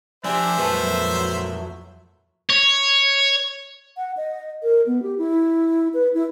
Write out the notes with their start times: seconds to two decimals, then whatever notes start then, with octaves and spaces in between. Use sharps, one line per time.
0.24 F3 D4 G4 C5 E5 G#5
0.58 F2 A#2 E3 F#3 A3 A4 B4
2.50 C#5
3.97 F#5
4.17 D#5
4.63 A#4
4.86 B3
5.02 G4
5.18 E4
5.94 B4
6.14 E4